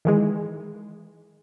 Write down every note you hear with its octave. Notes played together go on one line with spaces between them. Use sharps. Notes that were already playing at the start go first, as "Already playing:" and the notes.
D#3 E3 G#3